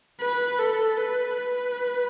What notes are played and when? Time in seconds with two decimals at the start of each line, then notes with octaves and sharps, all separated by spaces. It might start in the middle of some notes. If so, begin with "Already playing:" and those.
0.21 B4
0.59 A4
0.98 B4
1.37 B4